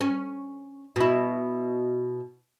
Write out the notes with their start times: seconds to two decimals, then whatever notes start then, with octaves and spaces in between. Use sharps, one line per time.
0.01 C#4
0.96 B2 E4